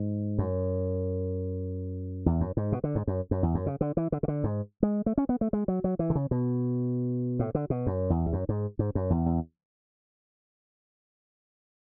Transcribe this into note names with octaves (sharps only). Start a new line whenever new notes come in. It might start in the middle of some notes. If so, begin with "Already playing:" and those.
Already playing: G#2
F#2
E2
F#2
G#2
B2
D3
G#2
F#2
F#2
E2
F#2
C#3
D3
E3
D3
C#3
D3
G#2
G#3
A3
C#4
B3
A3
G#3
F#3
F#3
E3
D3
C#3
B2
A2
D3
B2
F#2
E2
E2
F#2
G#2
G#2
F#2
E2
E2